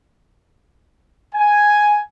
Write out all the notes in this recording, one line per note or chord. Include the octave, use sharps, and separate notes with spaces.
G#5